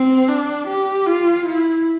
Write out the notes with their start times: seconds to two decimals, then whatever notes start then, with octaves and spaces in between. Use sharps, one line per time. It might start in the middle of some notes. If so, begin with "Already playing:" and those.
Already playing: C4
0.28 D4
0.68 G4
1.07 F4
1.46 E4